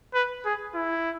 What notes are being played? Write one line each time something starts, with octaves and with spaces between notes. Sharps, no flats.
B4
G#4
E4